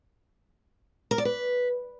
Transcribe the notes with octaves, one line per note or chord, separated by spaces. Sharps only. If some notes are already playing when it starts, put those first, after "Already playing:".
A#4
D5
B4